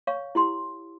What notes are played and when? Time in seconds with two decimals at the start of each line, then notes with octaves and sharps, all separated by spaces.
0.07 C#5 F5 C#6
0.35 E4 G4 C6